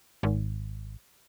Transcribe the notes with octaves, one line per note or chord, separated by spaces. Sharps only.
G#1